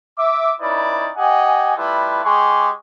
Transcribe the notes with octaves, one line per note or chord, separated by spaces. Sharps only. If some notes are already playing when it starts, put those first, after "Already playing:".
E5 D6
C#4 D#4 E4 B4 D5
G4 D#5 F#5 G#5
G3 A3 E4 F4 B4
G#3 G4 G#4 C6 C#6